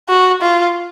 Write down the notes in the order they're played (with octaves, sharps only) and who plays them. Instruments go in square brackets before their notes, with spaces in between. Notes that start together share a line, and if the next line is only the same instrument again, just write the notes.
[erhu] F#4
F4